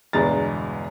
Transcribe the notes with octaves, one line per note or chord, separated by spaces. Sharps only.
G1 E2 B2 G#3 A#5 A6